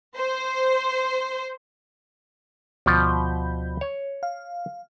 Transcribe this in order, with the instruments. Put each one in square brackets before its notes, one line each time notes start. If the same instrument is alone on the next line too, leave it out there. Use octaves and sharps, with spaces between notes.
[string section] C5
[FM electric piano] D2 B5 G6 [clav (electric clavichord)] B2 F3
[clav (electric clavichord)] C#5
[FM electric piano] F5